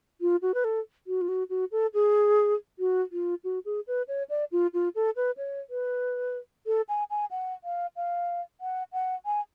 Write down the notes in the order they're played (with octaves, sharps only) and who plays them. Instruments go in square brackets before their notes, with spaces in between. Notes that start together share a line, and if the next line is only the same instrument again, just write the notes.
[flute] F4
F#4
B4
A4
F#4
F4
F#4
F#4
A4
G#4
F#4
F4
F#4
G#4
B4
C#5
D5
F4
F4
A4
B4
C#5
B4
A4
G#5
G#5
F#5
F5
F5
F#5
F#5
G#5